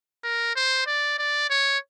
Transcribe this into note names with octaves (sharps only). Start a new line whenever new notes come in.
A#4
C5
D5
D5
C#5